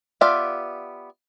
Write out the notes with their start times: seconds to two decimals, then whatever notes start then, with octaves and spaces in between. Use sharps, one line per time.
0.21 B3 F4 G4 D5 E5